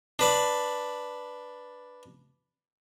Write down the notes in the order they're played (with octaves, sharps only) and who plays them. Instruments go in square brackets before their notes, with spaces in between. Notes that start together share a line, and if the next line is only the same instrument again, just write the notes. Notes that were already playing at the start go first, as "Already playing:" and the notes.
[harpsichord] D4 B4 D5